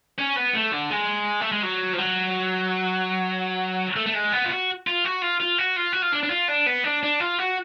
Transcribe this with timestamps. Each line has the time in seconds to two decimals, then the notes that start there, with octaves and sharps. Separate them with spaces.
0.19 C#4
0.37 B3
0.55 A3
0.72 D3
0.91 G#3
1.41 A3
1.52 G#3
1.63 F#3
1.93 F3
1.99 F#3
3.96 A3
4.06 A3
4.14 G#3
4.33 B3
4.44 F4
4.50 F#4
4.87 F4
5.05 F#4
5.22 F4
5.40 F4
5.58 F#4
5.76 F4
5.93 F#4
6.02 F4
6.13 D4
6.23 D4
6.30 F4
6.49 D4
6.66 B3
6.84 D4
7.03 D4
7.20 F4
7.39 F#4